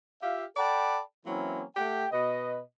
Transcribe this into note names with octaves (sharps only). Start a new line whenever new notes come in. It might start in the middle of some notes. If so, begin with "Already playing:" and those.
F4 G4 E5 F5
A4 D5 F#5 G5 A5 B5
E3 F#3 A#3 C4 C#4 E4
A3 G4 F#5 G5
B2 B4 D#5